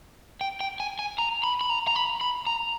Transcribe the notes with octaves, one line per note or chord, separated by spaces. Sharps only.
G5
G5
G#5
G#5
A#5
B5
B5
A#5
A#5
B5
B5
A#5